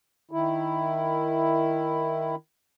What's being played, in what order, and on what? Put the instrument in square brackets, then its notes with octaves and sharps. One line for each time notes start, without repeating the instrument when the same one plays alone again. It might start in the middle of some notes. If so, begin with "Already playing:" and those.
[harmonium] D#3 E4